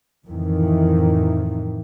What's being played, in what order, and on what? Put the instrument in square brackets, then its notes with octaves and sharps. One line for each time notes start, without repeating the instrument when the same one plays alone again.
[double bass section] F2 A2 D#3 E3